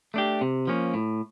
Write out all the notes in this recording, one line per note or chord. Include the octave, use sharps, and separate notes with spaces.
A3 D4 G4
C3
F3 A#3 C#4
A2